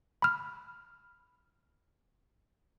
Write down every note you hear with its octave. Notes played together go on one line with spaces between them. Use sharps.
B5 F6